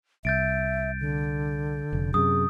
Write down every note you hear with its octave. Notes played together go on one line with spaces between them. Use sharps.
C2 E5 G6 A6 D7
D3
F1
F#2 C3 G#4 D#6